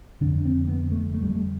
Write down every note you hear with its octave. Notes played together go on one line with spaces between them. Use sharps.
F2 D3 D4
C4
B3
A3
A3
G3
A3